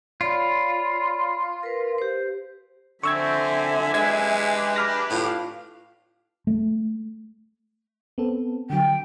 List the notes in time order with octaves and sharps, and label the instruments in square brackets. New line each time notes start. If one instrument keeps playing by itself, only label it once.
[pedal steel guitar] F4 [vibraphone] C#5 D5 B5
[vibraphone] A#4 B4
G4 C5
[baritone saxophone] D3 [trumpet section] C4 [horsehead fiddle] E5 G#5 [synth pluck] C#6 E6 G#6
[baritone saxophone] G#3 [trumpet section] D4 G4 B4 [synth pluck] G#6
[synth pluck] B5 F6 A#6
[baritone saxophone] A2 [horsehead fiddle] F4 F5
[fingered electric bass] A3
[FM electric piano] B3 C4 A4
[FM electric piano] D3 F#3 [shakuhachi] G5